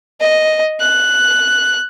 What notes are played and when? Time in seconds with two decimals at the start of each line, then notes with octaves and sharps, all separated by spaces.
0.21 D#5
0.80 F#6